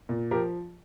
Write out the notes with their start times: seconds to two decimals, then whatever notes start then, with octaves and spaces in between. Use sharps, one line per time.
0.09 A#2
0.31 F3 G4 A#4